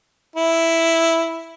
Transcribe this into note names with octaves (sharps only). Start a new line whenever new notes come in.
E4